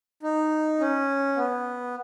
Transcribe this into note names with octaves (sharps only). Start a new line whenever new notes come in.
D#4
C#4
B3